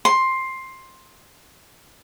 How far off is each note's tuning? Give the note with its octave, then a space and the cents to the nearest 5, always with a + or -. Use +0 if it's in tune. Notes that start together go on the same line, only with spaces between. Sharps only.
C6 +10